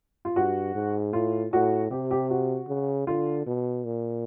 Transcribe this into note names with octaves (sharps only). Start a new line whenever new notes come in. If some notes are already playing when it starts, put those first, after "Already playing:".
F4
G2 F#4
G#2
A2 F4
A2 F#4
C3 G4
G4
F#4
C#3
D3 F4
B2
A#2